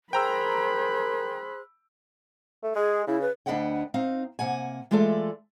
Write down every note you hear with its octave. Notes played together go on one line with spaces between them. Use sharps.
G#4 A#4 C5 G5 A#5 B5 E6 F#6
A3
G#3 G#4
C#3 E4
B4
D2 D4 B4 D#5 F#5 G5
C4 D#4 F5
C3 A#3 F#5 G#5
E3 G#3 A3 F4 A4 D5